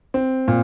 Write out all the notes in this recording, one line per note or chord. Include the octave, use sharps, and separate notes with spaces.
C4
A#2